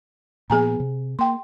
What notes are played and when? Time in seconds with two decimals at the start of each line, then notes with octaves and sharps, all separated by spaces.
0.50 A#2 F3 B3 G#4 G#5 A#5
0.80 C3
1.19 A#3 G5 C6